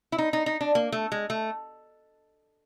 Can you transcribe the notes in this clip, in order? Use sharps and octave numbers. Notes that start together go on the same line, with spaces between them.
E4
D#4
D#4
D#4
D4
A#3
A3
G#3
A3